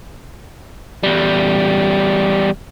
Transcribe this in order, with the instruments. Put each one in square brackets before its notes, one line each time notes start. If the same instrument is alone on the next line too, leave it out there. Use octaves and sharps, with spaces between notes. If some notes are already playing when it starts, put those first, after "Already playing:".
[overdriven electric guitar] E2 G3